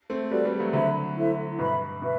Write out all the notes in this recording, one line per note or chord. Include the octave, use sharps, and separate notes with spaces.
A3 C4
G3 B3 F#4 A4 D5
G3 B3
F#3 A3
D3 F#3 C5 E5 B5
E4 A4 C5 E5
G2 B2 B4 E5 B5
B2 B4 E5